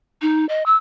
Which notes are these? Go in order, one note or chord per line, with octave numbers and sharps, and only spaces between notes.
D#4
D#5
E6